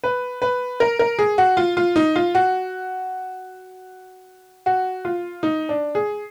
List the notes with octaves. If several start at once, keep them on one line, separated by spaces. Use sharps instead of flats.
B4
B4
A#4
A#4
G#4
F#4
F4
F4
D#4
F4
F#4
F#4
F4
D#4
D4
G#4